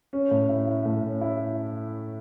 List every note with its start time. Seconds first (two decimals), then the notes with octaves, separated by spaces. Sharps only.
0.13 C#4
0.31 A2
0.49 E4
0.67 E4
0.85 A2
1.03 C#4
1.21 E4